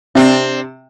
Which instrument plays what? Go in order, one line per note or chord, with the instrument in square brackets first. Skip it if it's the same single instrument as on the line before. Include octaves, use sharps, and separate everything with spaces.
[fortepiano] C3 [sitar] C4 D4